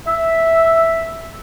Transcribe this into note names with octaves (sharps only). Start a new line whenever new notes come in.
E5